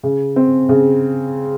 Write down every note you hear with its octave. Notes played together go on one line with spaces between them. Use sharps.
C#3
C4
C#3